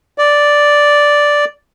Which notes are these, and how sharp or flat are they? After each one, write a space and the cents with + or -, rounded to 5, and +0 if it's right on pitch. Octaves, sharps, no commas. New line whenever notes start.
D5 -5